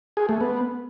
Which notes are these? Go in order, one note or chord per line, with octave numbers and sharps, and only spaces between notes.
G#4
A3
B3